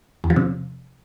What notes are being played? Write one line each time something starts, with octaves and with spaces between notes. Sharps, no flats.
E2
F3
C3